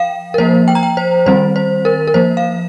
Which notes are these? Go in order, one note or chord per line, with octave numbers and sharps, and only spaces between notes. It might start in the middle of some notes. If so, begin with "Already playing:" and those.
Already playing: F3 F5 G5
A#4
F3 A#3 C5
G5
A#5
G5
C5
D#3 G3 C4 C5
C5
A#4
A#4
F3 A#3 C5
F5